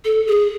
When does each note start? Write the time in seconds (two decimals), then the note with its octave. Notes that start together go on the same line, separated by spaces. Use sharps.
0.05 A4
0.27 G#4